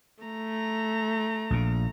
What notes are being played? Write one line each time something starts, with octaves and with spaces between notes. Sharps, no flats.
A3 A#5
A#1 A#2